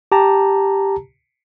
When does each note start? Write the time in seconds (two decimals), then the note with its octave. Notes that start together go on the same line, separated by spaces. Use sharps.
0.12 G4 A5 A#5